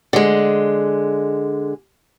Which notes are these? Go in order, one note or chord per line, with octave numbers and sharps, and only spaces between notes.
D3 G#3